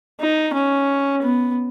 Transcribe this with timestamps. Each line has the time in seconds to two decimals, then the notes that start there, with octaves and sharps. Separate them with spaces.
0.20 D#4
0.53 C#4
1.22 B3